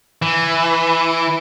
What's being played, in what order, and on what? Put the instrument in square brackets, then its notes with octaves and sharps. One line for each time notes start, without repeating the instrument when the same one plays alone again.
[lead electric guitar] E3